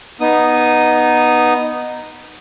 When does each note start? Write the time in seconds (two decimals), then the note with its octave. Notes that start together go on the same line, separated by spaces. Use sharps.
0.21 B3 D#4 D#6